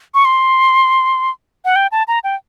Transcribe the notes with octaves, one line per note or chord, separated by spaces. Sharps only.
C#6
C6
F#5
G5
A5
A#5
G5